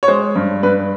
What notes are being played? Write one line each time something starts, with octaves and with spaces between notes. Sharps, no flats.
C#5
G#3 C5
G2
G2 B4